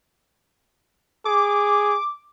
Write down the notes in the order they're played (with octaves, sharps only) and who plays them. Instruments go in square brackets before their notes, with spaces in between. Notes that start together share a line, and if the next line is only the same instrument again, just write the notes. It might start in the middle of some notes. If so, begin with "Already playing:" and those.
[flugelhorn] G#4 [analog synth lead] D6